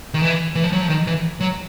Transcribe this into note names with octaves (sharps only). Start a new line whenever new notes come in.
D#3
E3
E3
F3
F#3
F3
D#3
E3
F#3